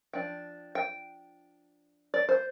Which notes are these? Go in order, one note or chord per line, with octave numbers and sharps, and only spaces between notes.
F3 D4 G5
G5
D5
C5